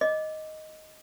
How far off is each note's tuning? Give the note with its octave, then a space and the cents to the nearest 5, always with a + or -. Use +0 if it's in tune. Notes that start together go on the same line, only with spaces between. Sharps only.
D#5 +0 D6 +0